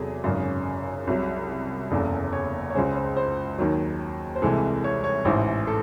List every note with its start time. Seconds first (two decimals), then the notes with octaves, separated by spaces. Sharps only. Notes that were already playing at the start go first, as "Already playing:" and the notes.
Already playing: E2 C3 F#3 G#4 A4
0.24 G#1 F#2 C#3
1.07 C2 C3 F#3
1.91 F#1 E2 C#3 A4
2.33 C#5
2.70 C#5
2.75 C#2 C#3 G#3 C5
2.96 C5
3.16 C5
3.58 D#2 D#3 F#3
4.36 C5
4.42 C2 C3 E3 G#3 A4
4.84 C#5
5.04 C#5
5.25 A1 G#2 E3 C5
5.67 A4